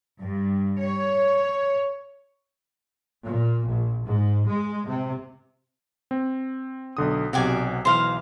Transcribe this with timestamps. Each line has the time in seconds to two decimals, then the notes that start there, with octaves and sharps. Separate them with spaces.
0.18 G2
0.81 C#5
3.24 A#2
3.67 A#1
4.05 G#2
4.47 G#3
4.86 C3
6.11 C4
6.97 B1 D3 D#6
7.33 B1 C3 F#4 D5 G#5
7.85 B1 E3 C5 F5 F6